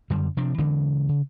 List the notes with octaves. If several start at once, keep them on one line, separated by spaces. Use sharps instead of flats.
F#2 D3 G3
C3 F3 C4 D4
C#3 E3 G#3 C4
C#3